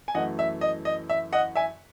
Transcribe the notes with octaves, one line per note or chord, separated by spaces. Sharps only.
G#5
F#2 E3 A3 D#5 F#5
E5
D#5
D#5
E5
D#5 F#5
E5 G#5